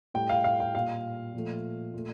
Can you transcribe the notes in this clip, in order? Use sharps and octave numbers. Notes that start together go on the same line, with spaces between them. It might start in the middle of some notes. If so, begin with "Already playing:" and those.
A2 G3 G5
F5
F5
G5
A#2 G3 F5
A#2 F3 A3
A#2 A3